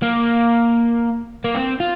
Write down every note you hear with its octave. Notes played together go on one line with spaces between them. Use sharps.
A#3
A#3
C4
F4